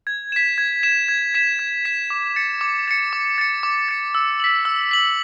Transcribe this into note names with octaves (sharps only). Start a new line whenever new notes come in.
G#6
B6 E7
G#6
B6 E7
G#6
B6 E7
G#6
B6 E7
D6
A6 C#7
D6
A6 C#7
D6
A6 C#7
D6
A6 C#7
E6
B6 F#7
E6
B6 F#7